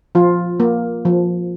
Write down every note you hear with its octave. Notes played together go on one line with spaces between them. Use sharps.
F3 F4
A#3
F3